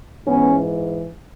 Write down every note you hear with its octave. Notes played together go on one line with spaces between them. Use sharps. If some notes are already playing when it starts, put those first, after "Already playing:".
G#2 E3 B3 C#4